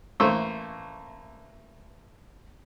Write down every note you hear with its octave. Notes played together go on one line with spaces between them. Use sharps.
A1 A3 A#3 C5 C#6 E6